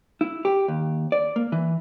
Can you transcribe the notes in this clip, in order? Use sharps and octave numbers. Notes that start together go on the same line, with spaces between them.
E4
G4
D#2
D5
A#3
E3